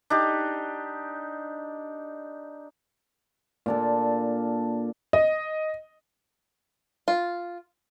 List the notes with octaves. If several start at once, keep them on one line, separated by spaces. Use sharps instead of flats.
D4 D#4 G4
A#2 D4 A4
D#5
F4